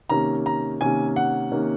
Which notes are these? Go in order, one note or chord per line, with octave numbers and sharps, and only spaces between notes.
C3 D#3 A#3 C#4 A#5
A#5
C3 D#3 A#3 C#4 G#5
F#5
C3 D#3 A#3 C#4